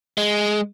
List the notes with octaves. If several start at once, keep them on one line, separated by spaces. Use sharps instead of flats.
G#3